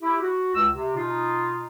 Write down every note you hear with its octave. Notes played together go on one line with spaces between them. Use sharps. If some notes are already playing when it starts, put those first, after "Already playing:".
E4 G4
F#4
C#2 E6
C3
B2 D#4 F4